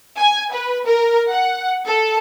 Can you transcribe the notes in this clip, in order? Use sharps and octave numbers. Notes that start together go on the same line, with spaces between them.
G#5
B4
A#4
F#5
A4